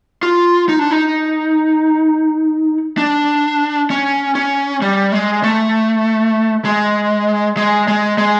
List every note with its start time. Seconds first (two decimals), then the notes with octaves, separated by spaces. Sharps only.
0.23 F4
0.69 D#4
0.79 D4
0.91 D#4
2.98 D4
3.90 C#4
4.35 C#4
4.82 G3
5.12 G#3
5.43 A3
6.65 G#3
7.57 G#3
7.88 G#3
8.18 G#3